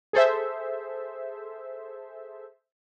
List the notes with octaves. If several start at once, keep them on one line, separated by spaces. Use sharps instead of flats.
G#4 A4 C5 E5